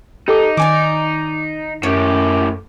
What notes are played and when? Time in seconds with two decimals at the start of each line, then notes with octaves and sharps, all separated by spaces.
0.28 D#4 G4 A4 D6
0.57 D#3 D5 G#5 D6
1.83 F#2 A2 G4 C#5